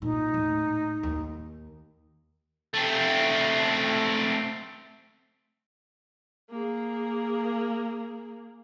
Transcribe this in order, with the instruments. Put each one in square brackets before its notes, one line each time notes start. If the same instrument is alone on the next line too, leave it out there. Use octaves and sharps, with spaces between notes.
[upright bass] A#2 [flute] D#4
[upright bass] D#1 A2
D#2
[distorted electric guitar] A3 C4
[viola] A#3 G#4